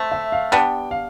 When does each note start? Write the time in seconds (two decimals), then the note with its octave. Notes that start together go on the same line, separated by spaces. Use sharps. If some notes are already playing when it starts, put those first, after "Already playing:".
Already playing: A3 C4
0.12 E5
0.32 F5
0.52 G3 B3 D4 G5
0.91 F5